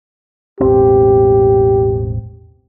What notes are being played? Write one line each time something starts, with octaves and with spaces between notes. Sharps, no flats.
E1 A1 C4 G4